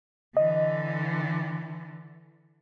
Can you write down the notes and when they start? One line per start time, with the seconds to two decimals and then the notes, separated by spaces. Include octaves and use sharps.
0.37 D3 E3 D#5